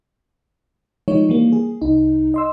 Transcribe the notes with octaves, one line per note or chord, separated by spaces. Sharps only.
F3 G3 G#3 D#4 C#5
E3 G3 A#3
G#4
C2 D#4
D#5 C6 E6